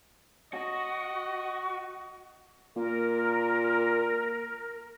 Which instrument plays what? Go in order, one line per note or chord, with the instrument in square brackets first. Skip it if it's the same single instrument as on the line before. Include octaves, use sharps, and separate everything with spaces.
[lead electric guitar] F#4 [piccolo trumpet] D#5
[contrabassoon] A#2 [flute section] A#4